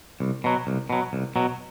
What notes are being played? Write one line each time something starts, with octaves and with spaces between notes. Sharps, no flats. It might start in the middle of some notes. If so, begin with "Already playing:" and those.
C2
B2 F#3
C2
B2 F#3
C2
B2 F#3